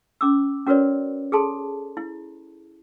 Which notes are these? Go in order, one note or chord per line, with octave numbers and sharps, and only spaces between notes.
C#4 D6 E6
C#4 F#4 A#4 B4 C#5 D5
G#4 A4 A5 C6
E4